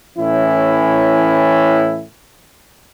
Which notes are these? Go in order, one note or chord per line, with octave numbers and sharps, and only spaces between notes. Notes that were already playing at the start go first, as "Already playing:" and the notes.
A2 E3 C#4 E4